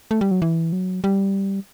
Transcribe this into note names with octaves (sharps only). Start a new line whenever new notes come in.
A3
G3
F#3
E3
F#3
G3